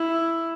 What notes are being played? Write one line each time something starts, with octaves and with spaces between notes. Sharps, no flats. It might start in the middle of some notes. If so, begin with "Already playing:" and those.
Already playing: E4